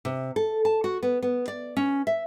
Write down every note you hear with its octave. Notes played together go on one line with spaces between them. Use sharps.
C3
A4
A5
F#4
B3
B3
D5
C#4
E5